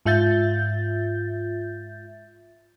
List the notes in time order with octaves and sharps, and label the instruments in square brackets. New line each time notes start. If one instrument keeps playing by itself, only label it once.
[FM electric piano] G#2 F4 E5 G6 A6